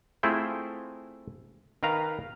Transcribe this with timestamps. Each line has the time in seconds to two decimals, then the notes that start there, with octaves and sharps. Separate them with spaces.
0.23 A3 C4 E4 F4 G#4 C5
1.83 D#3 A#4 B4 F5 A#5